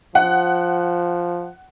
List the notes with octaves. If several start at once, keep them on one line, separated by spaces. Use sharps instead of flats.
F3 F#5